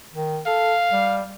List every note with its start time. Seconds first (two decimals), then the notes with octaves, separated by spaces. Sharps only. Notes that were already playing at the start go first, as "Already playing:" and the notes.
0.14 D#3
0.47 A4 F5
0.92 G3